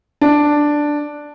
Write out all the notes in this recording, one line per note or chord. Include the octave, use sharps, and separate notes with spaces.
D4